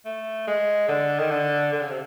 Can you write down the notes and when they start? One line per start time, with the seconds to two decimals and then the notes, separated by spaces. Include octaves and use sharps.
0.05 A3
0.47 G#3
0.88 D3
1.19 D#3
1.30 D3
1.73 D3
1.81 C#3
1.90 C3